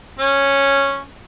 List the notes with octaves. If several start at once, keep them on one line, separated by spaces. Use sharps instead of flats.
C#4